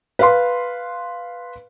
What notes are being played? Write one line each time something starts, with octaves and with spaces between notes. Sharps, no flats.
B4 F5 C6